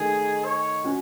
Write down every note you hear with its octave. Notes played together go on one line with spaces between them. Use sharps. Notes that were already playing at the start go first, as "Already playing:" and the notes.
Already playing: D#3 A3 D#4 G#4
C#5
C#4 F#4